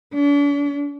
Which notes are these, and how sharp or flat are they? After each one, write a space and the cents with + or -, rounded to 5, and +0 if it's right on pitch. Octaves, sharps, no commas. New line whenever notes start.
D4 -45